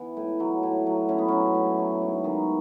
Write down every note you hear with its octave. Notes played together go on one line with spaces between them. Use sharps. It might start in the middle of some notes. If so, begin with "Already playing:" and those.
Already playing: E3 B3
A2
F#3
A2
F#3
A2 C#4
B3
F#3 C#4
A2
F#3
G#2
D#3